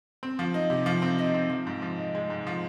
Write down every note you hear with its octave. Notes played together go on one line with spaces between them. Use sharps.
C4
F3
D#4
C3
F3
C4
D#4
C4
F3
G#2
F3
D#4
G#3
G#2
F3